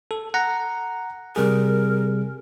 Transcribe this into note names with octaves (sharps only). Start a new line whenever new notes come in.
A4
F#5 A#5
C3 G3 G#4 A#4